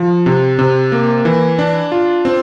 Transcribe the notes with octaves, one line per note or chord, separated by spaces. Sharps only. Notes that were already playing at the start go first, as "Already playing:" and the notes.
Already playing: F3
C3
C3
A#3
E3
D4
F4
C4